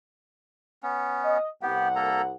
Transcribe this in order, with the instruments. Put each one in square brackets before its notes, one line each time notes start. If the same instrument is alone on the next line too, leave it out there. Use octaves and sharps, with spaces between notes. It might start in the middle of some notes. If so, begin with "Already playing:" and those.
[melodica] B3 C#4
[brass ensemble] D#5
[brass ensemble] C2 F#5 [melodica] B3 G4
[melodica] A#3 A4 A#5